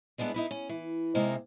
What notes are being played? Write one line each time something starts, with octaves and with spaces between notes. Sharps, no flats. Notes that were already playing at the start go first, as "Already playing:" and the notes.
G3 G#3 B3 D4 E4
D#4 E4 B4
C#4
E3
C3 G#3 A#3 D#4